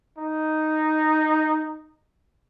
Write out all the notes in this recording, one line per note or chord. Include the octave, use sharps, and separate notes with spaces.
D#4